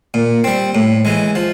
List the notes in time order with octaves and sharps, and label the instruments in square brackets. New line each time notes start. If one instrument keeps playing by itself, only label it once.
[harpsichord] A#2
G3 C4
A2
E3 G#3
F3